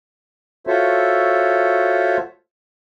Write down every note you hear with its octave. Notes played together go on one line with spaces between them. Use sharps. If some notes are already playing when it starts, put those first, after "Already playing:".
F4 F#4 A4 C5 C#5 E5